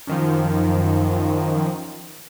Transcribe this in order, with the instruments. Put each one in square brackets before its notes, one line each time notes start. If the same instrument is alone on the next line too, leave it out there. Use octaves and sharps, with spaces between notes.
[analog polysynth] F#2 D#3 F3